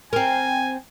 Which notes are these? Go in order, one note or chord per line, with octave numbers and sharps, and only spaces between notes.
C4 A#4 G#5